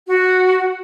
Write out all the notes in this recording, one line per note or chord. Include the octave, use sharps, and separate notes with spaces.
F#4